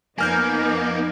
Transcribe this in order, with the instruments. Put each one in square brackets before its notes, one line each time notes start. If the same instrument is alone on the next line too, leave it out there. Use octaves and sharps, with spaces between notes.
[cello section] F2 B3 D#4 [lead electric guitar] A#3 [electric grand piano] G#5 F6 G6